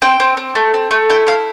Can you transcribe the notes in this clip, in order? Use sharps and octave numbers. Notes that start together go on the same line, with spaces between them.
C4 G5
C4
C4
A3
C4
A3
E4 G5
E4 F5